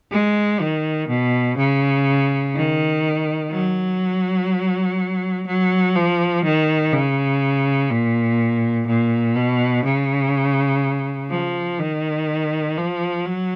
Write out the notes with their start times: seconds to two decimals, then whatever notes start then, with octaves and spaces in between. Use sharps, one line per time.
0.12 G#3
0.61 D#3
1.08 B2
1.58 C#3
2.55 D#3
3.51 F#3
5.47 F#3
5.95 F3
6.44 D#3
6.93 C#3
7.91 A#2
8.87 A#2
9.36 B2
9.85 C#3
11.30 F3
11.79 D#3
12.77 F3
13.25 F#3